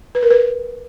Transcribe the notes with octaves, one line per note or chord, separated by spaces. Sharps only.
B4
A#4
B4